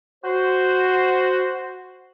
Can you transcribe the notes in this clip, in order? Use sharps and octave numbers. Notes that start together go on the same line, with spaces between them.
F#4 C5